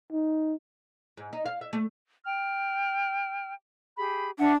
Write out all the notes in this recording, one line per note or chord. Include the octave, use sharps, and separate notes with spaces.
D#4
G#2
D#4
F5
E5
A3
G5 F6
G4 G#4 B5
D4 E5 F#5